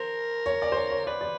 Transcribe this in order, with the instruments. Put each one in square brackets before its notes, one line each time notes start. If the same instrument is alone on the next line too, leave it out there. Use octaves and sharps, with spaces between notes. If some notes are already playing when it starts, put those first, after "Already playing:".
Already playing: [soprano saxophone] A#4 [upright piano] C5
[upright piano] C#5
D5
C5
C#5
C#5
[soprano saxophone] B4 [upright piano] D5
[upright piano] D5